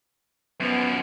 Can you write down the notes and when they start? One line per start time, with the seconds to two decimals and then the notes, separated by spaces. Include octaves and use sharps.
0.60 F#2 F3 B3